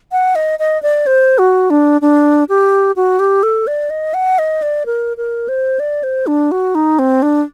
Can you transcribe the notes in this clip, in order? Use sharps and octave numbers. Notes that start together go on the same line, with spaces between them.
F#5
D#5
D#5
D5
C5
F#4
D4
D4
G4
F#4
G4
A4
D5
D#5
F#5
D#5
D5
A#4
A#4
C5
D5
C5
D4
F#4
D#4
C4
D4